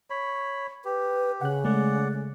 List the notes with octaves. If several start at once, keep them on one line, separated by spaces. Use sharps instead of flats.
C#5 B5
G4 B4
C#3 F#5 F#6
G#3 A3 D5 F#5